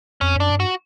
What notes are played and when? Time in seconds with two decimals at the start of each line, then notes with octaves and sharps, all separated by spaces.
0.21 F2 C#4
0.36 F#2 D4
0.50 G2
0.60 F#4